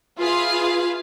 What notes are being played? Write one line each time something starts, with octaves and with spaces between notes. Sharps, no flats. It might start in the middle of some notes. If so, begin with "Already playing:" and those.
F4 G#4 B4 E5 F5